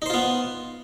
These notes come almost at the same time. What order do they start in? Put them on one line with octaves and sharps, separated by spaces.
D#4 C5 F4 B3